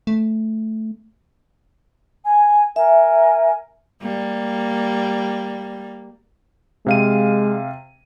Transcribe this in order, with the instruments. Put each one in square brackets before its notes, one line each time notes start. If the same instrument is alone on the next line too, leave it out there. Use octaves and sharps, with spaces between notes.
[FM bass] A3
[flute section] G#5
[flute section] A#4 G#5 [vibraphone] E5
[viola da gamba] G3 A#3
[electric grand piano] C3 F5 D#7 [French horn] G#3